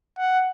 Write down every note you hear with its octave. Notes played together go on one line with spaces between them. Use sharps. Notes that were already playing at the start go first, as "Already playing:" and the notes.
F#5